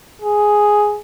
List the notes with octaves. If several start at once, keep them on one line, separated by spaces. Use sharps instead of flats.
G#4